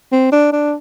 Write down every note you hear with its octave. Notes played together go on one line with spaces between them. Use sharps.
C4
D4
D4